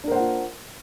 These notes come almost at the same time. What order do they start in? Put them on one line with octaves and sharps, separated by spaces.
D4 A#4 C5 F#5 F4